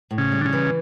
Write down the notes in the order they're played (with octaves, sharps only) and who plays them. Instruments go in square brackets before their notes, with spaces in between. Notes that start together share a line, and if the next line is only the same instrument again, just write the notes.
[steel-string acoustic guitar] A2
[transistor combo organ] C#3
[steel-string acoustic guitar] G3
[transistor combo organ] D3
C#3
[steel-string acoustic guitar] E3